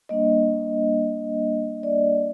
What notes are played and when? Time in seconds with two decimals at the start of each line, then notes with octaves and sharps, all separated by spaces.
0.09 G3 A#3 D4 D#5
1.83 D5